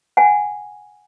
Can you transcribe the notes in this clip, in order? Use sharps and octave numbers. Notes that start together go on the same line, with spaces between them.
F#5 G#5